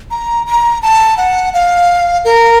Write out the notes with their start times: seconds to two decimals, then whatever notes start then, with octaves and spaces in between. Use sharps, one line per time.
0.11 A#5
0.47 A#5
0.82 A5
1.17 F#5
1.54 F5
2.25 A#4